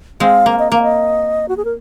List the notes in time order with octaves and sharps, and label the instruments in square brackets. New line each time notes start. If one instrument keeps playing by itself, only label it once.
[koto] G#3 C4 [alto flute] F5
[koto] A#3
[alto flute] D#5
[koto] A#3 [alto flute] F5
[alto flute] D#5
F#4
G#4
A#4